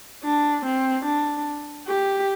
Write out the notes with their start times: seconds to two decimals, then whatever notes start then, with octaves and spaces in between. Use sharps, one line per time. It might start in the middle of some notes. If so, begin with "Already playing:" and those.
0.24 D4
0.65 C4
1.05 D4
1.87 G4